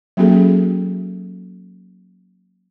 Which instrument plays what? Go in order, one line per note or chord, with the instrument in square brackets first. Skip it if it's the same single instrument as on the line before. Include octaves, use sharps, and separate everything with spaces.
[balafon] F#3 A#3 C#4 F#4 G#4 A4